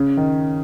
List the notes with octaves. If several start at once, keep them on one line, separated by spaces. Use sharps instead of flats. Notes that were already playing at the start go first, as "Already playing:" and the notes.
Already playing: C#3
D#3